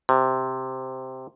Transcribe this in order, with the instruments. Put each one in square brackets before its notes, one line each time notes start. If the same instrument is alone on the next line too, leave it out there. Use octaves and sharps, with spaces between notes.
[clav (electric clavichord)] C3